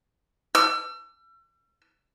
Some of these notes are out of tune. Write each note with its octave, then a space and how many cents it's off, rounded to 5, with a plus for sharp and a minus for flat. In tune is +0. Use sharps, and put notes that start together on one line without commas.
E6 +40